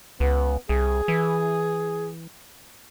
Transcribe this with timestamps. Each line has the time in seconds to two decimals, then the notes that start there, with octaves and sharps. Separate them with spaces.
0.20 C#2 B3
0.69 C2 G#4
1.08 E3